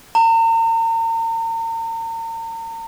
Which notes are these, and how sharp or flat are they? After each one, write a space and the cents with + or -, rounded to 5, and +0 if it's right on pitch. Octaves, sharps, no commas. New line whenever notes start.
A#5 -40